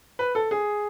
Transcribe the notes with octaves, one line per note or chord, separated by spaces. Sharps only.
B4
A4
G#4